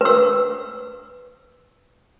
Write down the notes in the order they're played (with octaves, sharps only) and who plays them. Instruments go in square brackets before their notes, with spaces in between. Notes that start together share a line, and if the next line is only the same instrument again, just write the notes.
[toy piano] B4 E6